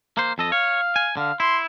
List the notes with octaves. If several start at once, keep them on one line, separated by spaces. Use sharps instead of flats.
A#3 C5
F2 A4 D#5
C#5 F5
G#5
D3 F5
E4 C6